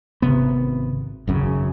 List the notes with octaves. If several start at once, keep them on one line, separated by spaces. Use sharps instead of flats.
G#1 C3 B3
G#1 F#2 C#3